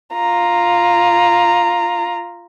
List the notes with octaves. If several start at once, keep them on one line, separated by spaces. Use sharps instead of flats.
F4 A#5